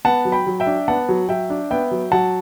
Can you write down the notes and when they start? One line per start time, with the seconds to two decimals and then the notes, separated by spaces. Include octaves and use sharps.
0.05 B3 F#5 A5
0.25 F#3
0.32 G5 B5
0.47 F#3
0.60 E5 G5
0.66 D4
0.88 B3 F#5 A5
1.09 F#3
1.29 F#3 E5 G5
1.50 D4
1.71 B3 E5 G5
1.91 F#3
2.12 F#3 F#5 A5